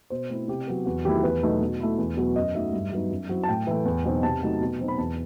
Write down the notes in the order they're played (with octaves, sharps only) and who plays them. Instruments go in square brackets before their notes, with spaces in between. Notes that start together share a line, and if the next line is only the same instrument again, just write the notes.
[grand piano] B2 C5
A3 C4 E4
C3 G4
F#3 B3
E2 F#4
D#3 F#3 A3 E4 G4
E2 B4
B2 F#3 A3 D#4
B2
A3 E4
E2
B2 F#3 B3
F#2 D#5
F#3 A3 D#4 E5
G2
F#3 B3 D#4
F#2
F#3 C4 E4
A5
A2 G5
E3 A3
E2
B2 F#3 C4 D#4
C3 A5
F#3 A3 D#4
B2
F#3 C4 D#4
B5
E2 A5